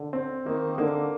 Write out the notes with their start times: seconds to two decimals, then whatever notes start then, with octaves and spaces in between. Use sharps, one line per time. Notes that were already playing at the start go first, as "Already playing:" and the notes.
Already playing: D3
0.13 C4
0.46 D#3 A#3
0.77 D3 A#3